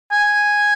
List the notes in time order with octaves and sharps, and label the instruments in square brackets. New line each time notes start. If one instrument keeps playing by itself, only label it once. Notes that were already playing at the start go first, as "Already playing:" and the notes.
[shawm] G#5